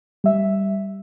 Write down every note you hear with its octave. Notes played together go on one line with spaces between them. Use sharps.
G3 E5